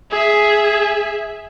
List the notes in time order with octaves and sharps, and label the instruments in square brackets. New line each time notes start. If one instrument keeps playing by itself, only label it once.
[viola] G#4 E5